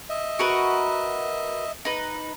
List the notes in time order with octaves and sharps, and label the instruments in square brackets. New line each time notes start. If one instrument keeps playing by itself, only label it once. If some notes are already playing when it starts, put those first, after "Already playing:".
[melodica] D#5 E5
[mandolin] F#4 A#4 B4
D#4 B4